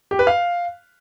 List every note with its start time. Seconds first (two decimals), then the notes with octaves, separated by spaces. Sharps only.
0.11 G4
0.19 B4
0.27 F5